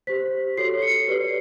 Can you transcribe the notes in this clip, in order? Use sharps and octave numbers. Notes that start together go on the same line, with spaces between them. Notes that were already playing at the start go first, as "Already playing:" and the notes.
G4 C5 B6
F#4 A4 C#5 C7
C#7
G4 B4 D5 C7